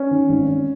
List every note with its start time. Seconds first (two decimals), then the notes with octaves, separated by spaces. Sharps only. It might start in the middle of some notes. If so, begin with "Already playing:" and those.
Already playing: C#4
0.11 D#3
0.29 G#1
0.48 G#1